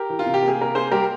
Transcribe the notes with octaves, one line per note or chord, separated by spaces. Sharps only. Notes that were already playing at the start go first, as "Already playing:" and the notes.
Already playing: G4 A#4
E3
F4
C3
G4
A#3
G#4
C3 A#4
A#3 G#4 C5
G3 G4 A#4